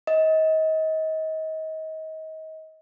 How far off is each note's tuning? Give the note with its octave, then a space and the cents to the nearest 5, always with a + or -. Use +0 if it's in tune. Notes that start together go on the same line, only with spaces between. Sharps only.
D#5 +30